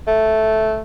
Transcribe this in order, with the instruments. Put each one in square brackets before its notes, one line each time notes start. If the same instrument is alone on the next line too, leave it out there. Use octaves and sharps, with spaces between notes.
[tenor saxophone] A3